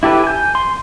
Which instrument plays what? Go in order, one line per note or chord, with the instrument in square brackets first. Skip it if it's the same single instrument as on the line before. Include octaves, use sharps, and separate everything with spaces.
[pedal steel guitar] E4 G4 A4 B4
G#5 G6
C6